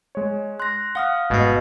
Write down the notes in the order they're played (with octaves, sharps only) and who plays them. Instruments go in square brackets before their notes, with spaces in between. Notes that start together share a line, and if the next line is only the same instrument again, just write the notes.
[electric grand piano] G#3 C#5
[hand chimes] C6 A#6 [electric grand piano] F#6
[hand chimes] F5 D#6 F6 [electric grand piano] F#5
[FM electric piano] G#1 G#2 D#5 [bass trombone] B2